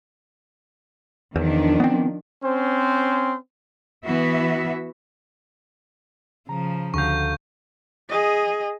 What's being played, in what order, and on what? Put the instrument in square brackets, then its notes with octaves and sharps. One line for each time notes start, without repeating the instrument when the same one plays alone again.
[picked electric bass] E2 [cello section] D#3 F3 D4
[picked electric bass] B3 C4
[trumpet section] C4 C#4 C5
[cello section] E3 B3 F#4 E5
[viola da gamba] C#3 F3 [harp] A#5
[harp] D2 F#4 F5 [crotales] C#6 G6
[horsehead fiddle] G#4 D#5